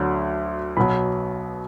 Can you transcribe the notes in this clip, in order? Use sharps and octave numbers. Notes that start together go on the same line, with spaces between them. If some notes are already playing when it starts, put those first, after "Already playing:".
Already playing: D2 D3 F#3
B1 B2 F#3 B5